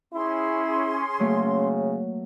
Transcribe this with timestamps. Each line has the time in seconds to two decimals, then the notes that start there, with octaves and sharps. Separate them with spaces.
0.13 C#4 E4 G#4 C6
1.20 C#3 F#3 A3 A#3